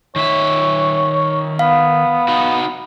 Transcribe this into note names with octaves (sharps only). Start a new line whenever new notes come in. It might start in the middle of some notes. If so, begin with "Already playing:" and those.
D#3 C#5 E5
B3 F5
D#4 F#4